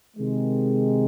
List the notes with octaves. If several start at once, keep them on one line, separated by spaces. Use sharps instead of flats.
C3 D#3 G#3